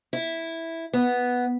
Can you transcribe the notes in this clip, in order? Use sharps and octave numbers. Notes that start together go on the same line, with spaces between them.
E4
B3